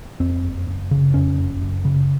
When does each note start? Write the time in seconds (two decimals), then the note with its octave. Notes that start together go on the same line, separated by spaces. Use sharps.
0.20 F2 C4
0.43 F#1
0.67 F#1
0.91 C#3
1.14 F2 C#4
1.38 F#1
1.61 F#1
1.85 C#3